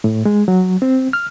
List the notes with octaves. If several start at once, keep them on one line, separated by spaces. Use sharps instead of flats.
A2
G#3
F#3
C4
F6